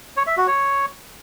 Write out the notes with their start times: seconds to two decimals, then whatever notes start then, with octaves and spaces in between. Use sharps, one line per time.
0.17 C#5
0.27 E5
0.37 F#4
0.47 C#5